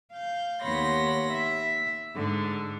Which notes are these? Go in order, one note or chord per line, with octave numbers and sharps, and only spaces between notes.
F5 G6
D#2 B3 C#5 B5 C6 A#6
E5
G#2 D3